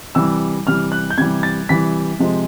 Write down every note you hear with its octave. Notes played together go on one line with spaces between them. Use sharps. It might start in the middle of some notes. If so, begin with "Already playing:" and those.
C3 E3 G3 E6
C3 E3 G3 F6
F#6
G6
C3 E3 G3 G#6
A6
C3 E3 G3 B6
C3 F3 G#3